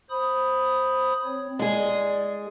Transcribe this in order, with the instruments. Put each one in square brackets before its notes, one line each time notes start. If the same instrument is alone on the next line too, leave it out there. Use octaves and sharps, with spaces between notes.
[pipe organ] C5 B5 D#6
C4 C#5
[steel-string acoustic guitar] G#3 G#4 [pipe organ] D5